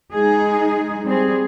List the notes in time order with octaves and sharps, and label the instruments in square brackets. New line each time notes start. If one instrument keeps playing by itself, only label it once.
[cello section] G#3 D#4 G#4
G3 C4 G#4